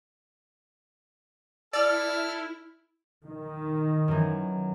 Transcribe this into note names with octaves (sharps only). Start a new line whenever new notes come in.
E4 A4 D5 F6
D#3
F#2 E3